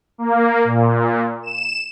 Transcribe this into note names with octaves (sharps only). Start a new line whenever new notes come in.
A#3
A#2
E7